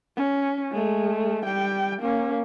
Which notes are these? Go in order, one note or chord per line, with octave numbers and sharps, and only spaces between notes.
C#4
G#3 A3
G3 G5
A#3 C#4